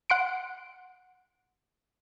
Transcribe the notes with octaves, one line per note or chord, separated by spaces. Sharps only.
F#5 C6 D7